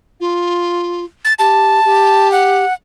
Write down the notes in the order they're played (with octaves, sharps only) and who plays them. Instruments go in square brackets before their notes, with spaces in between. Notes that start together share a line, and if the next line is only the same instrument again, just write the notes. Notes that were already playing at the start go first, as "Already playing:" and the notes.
[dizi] F4
[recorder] A6
[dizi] G4 [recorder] A5
[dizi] G4
[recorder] F#5